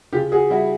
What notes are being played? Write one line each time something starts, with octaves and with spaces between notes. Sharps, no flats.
C#3 F4 G4
F#4 G#4
G3 E4 F#4